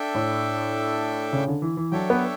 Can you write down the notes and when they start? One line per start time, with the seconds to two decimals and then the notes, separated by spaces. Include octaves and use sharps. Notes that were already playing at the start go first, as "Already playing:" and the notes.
Already playing: D4 A4 E5 G5
0.15 A2
1.33 C#3
1.48 D3
1.62 E3
1.77 E3
1.92 F#3 D4 A4 C#5 E5 G5
2.10 B3